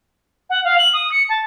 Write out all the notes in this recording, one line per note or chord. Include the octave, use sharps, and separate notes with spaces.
F#5
F5
F#7
D#6
C#7
A5